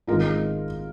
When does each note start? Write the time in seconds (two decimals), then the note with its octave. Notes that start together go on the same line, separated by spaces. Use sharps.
0.07 G#1 G#2 G#3 D#4 F4 A#4